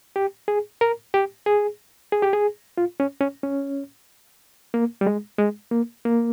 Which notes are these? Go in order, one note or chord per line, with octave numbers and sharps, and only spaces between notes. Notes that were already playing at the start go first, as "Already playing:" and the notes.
G4
G#4
A#4
G4
G#4
G#4
G4
G#4
F4
C#4
C#4
C#4
A#3
G3
G#3
G#3
A#3
A#3